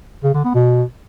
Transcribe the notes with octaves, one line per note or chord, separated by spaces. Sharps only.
C#3
D3
B3
B2